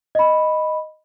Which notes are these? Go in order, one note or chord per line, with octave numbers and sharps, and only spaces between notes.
D#5 B5